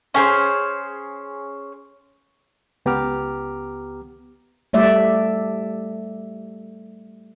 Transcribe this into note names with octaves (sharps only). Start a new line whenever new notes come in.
C#4 G#4 A4 C5
C#2 B3 G4 A#5 D6 F6
G3 A3 D5 E5